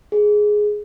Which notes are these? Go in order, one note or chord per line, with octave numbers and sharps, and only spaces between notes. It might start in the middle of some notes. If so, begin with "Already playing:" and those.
G#4